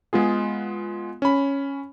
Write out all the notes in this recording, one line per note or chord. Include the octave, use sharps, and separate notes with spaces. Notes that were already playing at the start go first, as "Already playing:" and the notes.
G#3 B3 F4 G#4
C#4 B5